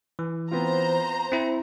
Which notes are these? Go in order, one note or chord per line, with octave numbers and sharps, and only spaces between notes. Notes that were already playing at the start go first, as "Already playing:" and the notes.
E3
B3 C4 F4 C5 A#5
C4 E4